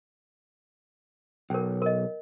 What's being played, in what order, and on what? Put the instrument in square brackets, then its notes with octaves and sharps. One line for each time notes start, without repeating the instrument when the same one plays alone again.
[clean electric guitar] B1 [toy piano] A#4 G5
[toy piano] A#4 D#5